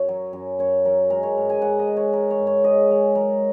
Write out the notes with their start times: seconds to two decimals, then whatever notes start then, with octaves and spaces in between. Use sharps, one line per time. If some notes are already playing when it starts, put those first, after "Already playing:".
Already playing: F#2 C#5
0.09 F#3
0.33 F#2
0.59 F#2 C#5
0.85 F#3 A#4
1.10 G#3 A#4
1.23 C#5
1.37 G#2
1.50 G#5
1.61 G#2 F#5
1.79 D#5
1.87 G#3
1.97 C#5
2.13 G#3 A#4
2.31 C#5
2.39 G#2
2.47 C#5
2.64 G#2 D#5
2.90 G#3 C#5
3.15 F#3 A#4